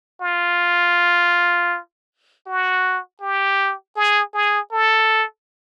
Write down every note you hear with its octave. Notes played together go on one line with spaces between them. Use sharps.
F4
F#4
G4
G#4
G#4
A4